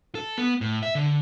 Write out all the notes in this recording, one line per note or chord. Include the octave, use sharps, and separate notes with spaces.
A4
B3
A2
E5
D3